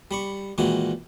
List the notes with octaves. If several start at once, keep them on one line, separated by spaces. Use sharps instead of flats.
G3 B5 C#6
A#2 D#3 E3 G#3 F#4